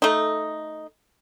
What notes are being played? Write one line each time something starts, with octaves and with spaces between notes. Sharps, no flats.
A3 D#4